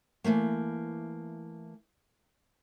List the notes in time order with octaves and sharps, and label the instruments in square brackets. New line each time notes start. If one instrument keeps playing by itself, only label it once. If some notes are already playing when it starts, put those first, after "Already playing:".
[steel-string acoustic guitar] E3 F3 A3 A#3